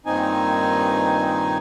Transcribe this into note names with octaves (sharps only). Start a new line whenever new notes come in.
G2 A#2 D#3 C4 D#4 G#5